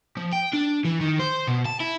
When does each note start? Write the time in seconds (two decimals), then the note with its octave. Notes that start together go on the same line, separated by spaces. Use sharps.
0.17 F3
0.32 G5
0.53 D4
0.85 E3
1.01 D#3
1.19 C5
1.47 B2
1.65 A5
1.80 E4